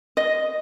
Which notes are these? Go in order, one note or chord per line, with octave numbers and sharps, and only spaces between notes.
D#5